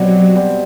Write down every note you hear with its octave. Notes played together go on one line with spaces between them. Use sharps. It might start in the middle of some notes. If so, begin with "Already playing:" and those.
Already playing: B2 F#3 G3 C4
B2 G3 C4